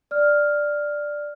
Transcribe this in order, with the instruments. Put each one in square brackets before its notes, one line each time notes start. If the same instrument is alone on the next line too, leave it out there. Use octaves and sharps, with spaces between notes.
[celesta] D5 F6